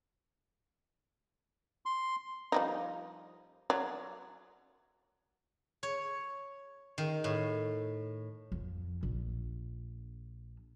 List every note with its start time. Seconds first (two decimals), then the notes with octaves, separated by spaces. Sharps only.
1.86 C6
2.52 F3 G3 D#4
3.70 F#3 D5
5.83 C#5
6.98 D#3
7.24 A2
8.52 F2
9.03 A#1